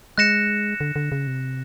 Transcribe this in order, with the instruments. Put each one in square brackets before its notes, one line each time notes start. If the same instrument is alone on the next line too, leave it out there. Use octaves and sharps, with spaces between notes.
[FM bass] G#3 [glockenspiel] F#6 A#6 C#7 E7
[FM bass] D3
D3
C#3
C3